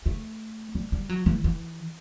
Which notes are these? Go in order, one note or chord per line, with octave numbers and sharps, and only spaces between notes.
A3
G3
G3
F#3
E3
E3